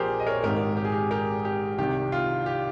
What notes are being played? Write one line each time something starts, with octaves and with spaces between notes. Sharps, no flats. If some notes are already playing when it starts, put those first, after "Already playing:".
Already playing: A#1 A#2 F3 G4 G#4 A#4 C5
D#5
A#4 C#5
G#1 G#2 D#3 G4 A#4
G4
G#4
G4
G4 A#4
G4
C2 C3 D#3 G4
F4
G4